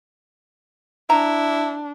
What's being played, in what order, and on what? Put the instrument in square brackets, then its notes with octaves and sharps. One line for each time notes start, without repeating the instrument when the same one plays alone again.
[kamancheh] D4 [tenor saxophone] E4 [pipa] A#5